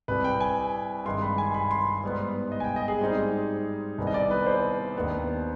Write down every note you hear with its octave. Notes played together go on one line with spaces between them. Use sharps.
C2 C3 G3 B4
G5
G#5
G2 D#3 G#3 C6
B5
G#5
B5
C6
G#2 G3 B3
D#5
G#5
G5
D#5
G#4
G#2 G3 C4 D#4
C2 C3 D#3 G3 B3
D#5
D5
B4
C5
D#2 D#3 B3 D4